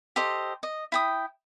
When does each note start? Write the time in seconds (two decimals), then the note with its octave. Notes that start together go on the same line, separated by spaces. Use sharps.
0.16 G4 A4 C5 D#5
0.63 D#5
0.92 E4 G5 D#6